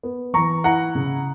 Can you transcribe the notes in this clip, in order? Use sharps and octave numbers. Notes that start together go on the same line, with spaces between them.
B3
E3 A#5 C#6
E4 F#5 A#5
C#3